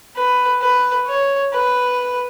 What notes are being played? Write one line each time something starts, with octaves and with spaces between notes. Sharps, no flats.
B4
B4
C#5
B4